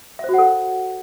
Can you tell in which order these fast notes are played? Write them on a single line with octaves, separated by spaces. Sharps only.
E5 C5 F#4 F#5 A4